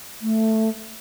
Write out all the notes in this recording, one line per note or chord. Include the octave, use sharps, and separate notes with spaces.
A3